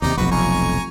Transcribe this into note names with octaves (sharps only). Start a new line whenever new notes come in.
D#2 C3 D#4 D5 A#5
F1 B1 F2 F#4 B4
G#5 A#5 C#6